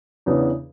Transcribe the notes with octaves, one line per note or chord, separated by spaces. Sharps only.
E2 C#3 E3 B3 D4